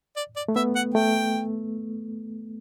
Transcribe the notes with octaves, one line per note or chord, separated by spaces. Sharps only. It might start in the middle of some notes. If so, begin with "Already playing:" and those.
D5
D5
A3
B3 E5
F#5
A3 G5